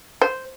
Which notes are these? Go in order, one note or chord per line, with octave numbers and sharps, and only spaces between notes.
C5